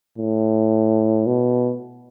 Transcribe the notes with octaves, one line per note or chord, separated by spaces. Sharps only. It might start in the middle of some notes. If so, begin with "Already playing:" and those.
A2
B2